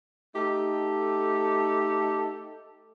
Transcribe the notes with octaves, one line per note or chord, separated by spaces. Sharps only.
A3 D#4 G4 A4